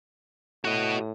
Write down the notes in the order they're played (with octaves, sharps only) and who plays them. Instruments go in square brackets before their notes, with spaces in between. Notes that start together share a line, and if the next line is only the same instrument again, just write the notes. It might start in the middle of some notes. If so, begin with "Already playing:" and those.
[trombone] A2 [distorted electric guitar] F#4 D#5